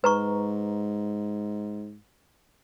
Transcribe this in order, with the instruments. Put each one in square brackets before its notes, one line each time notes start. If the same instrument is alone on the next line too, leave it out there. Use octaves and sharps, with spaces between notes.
[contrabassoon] G#2 [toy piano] B4 A#5 C#6